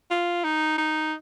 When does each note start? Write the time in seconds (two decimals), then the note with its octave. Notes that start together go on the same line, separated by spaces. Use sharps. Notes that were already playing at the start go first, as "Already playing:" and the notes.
0.10 F4
0.44 D#4
0.78 D#4